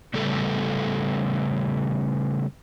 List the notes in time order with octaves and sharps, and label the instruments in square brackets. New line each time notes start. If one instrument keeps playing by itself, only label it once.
[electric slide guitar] C#3 G3 A3 B3 A4